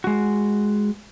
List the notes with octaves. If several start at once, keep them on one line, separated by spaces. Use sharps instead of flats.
G#3 F#4